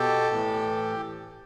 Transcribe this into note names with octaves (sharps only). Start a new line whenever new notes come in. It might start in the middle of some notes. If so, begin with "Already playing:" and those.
Already playing: B2 G4 A4
A2 E3